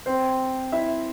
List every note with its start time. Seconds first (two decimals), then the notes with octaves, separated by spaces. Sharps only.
0.06 C4 C5
0.72 E4 E5